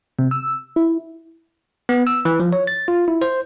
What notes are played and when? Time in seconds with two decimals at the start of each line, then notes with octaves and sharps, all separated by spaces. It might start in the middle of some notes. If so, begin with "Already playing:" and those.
0.19 C3
0.31 E6
0.76 E4
1.89 B3
2.07 E6
2.25 E3
2.40 F3
2.53 C#5
2.67 A6
2.88 F4
3.08 E4
3.22 C5